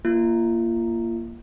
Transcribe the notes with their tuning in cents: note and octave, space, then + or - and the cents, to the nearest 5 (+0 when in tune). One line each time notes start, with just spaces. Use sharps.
A#3 +0 F4 -35